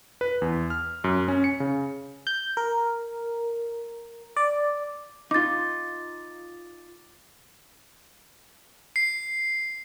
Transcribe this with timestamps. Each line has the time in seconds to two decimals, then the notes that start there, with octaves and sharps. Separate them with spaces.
0.21 B4
0.42 E2
0.70 F6
1.04 F#2
1.28 C#4
1.44 C#7
1.60 C#3
2.27 G6
2.57 A#4
4.37 D5
5.31 D#4 F4 D6 A6
8.96 C7